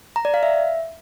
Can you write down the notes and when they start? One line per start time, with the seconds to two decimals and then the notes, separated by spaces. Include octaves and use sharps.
0.16 A#5
0.25 D5
0.34 F5
0.43 E5